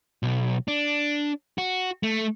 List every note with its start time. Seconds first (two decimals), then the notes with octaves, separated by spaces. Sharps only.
0.23 B1
0.68 D4
1.58 F#4
2.03 A3